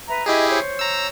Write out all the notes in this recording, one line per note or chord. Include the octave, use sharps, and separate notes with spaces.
B4 E5 A#5
E4 G4 G#4 D#5 E5
C5 C#5
A#5 E6